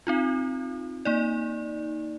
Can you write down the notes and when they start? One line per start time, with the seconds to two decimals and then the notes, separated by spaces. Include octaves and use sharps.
0.07 C4 D#4 F4
1.05 A#3 D#4 D5